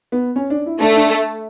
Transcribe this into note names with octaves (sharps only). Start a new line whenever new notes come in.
B3
C#4
D4
E4
A3 D4
D4